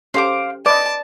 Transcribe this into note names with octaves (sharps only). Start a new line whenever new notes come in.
C#4 G4 A4 C5 F5 D6
B4 D5 D#5 A5 D6